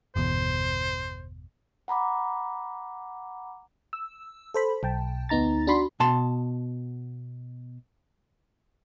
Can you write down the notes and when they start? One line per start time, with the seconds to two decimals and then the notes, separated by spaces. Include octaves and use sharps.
0.16 G1 E2 B2 C5
1.88 F#5 A#5 B5 D6
3.93 E6
4.54 A4 C5 B5
4.83 B1 G5 A5
5.29 D2 B3 D#4 A#5 A6
5.67 D4 F#4 B5 C6
6.00 B2 A5 C6